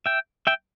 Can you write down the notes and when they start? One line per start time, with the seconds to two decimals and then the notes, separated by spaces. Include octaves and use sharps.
0.06 E5 G5
0.47 E5 G5